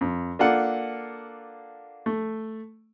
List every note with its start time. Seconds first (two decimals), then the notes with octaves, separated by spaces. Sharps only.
0.01 F2
0.39 A#3 D4 F4 A4 F#5
2.06 A3